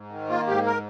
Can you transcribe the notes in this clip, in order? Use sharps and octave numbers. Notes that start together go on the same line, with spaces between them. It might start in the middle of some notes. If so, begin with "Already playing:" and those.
Already playing: G#2
D#3
A#3 F4
G#2 G4
A#4